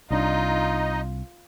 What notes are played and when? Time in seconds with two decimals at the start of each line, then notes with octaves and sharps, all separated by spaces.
0.10 C2 D4 D#4 F4 D#5